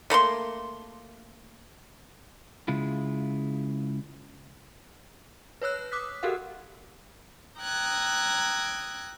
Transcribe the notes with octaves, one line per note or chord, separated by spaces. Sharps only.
A3 A#3 B5 C6
C#3 G#3 E4 F4
B4 C#5 E6 F#6
D6 D#6 F#6 B6
F#4 G4 A4 A#4 F5 F#5
G5 A#5 D#6 E6 F#6 G#6